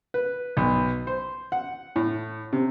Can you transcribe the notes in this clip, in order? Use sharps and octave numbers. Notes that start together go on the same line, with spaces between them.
B4
B1
C5
F#5
A2
C3